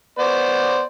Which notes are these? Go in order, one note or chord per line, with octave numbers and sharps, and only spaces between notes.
B3 C5 D5